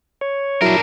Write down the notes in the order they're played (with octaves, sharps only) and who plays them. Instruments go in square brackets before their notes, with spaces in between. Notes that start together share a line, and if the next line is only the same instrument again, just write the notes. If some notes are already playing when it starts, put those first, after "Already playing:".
[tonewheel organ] C#5
[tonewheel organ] F#3 E4 [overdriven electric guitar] D4 A#4